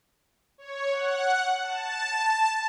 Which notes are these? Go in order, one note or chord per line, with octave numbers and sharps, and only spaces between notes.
C#5
F#5
A5